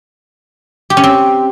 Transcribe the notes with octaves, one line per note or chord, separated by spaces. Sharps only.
G4
C#4
C4